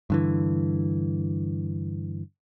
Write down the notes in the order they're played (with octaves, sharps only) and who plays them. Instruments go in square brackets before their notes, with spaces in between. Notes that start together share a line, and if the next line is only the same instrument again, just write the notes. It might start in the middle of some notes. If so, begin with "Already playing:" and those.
[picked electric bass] G2 D3 E3